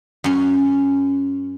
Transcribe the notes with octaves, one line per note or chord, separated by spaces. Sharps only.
F#2 C#4